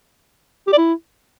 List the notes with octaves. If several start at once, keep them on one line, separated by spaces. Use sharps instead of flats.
G4
D5
E4